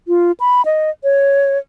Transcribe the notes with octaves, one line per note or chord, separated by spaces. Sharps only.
F4
B5
D#5
C#5